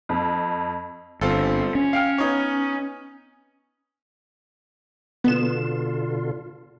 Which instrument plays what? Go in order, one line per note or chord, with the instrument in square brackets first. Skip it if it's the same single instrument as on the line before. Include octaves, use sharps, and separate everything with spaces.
[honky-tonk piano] F2
[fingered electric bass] G1 [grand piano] C4 F4 A4
[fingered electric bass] C#4
[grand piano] F5 G5 F6
B3 D#4 C#5
[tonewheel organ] B2 D3 F4 [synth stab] B3 E7